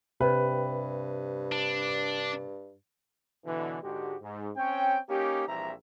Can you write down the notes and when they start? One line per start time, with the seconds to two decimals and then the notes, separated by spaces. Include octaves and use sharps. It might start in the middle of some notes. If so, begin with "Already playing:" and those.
0.21 G2 C3 B4
1.52 D4
3.45 B2 D3 E3
3.83 G#2 D3 G#3 F#4 G4
4.22 G#2
4.57 C4 C#4 C#5 G5
5.10 A#3 C#4 D#4 G4
5.48 A#1 E3 G3 C4 E5 A#5